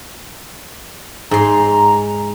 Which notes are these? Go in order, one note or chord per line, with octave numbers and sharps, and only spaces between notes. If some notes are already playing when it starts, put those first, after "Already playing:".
G#2 A#5 C6